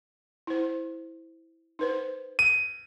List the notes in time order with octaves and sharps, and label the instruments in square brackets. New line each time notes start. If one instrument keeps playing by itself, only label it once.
[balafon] E4 C5
D#4 B4 C5
[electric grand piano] D#7